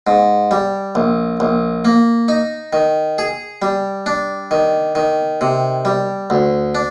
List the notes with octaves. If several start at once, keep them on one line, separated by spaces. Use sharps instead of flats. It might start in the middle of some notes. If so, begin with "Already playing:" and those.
G#2
G3
A#1
A#1
A#3
D#4
D#3
G#4
G3
D4
D#3
D#3
C3
G3
D2
D4